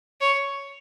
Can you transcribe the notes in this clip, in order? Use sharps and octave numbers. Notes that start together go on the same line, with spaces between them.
C#5